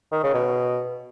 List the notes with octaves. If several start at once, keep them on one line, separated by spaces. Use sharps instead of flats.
D#3
C#3
B2